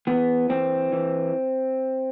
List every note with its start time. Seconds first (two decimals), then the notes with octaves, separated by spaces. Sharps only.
0.07 E3 B3
0.49 E3 C4
0.92 E3